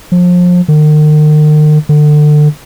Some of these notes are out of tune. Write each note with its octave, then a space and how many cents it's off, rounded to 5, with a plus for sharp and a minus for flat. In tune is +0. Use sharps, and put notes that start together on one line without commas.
F3 +30
D#3 -40
D3 +30